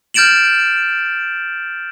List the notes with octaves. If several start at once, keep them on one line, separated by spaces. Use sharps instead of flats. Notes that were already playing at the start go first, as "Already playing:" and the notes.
F6 G6 A6 D7 E7 F#7